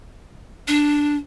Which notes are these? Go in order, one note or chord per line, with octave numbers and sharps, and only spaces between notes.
D4